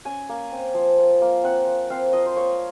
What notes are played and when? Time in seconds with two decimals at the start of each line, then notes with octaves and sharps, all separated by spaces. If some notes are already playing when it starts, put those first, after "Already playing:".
0.05 C#4 G#5
0.29 A#3
0.52 C4
0.74 F3
0.98 F4
1.22 A#3
1.43 C4 F#5
1.66 F3
1.90 C4 F5
2.13 F3 D#5
2.26 C5
2.36 A#3 C#5